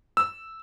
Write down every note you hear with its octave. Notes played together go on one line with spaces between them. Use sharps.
E6